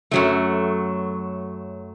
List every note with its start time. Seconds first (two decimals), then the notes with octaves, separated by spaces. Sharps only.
0.11 F#2 F#3 A3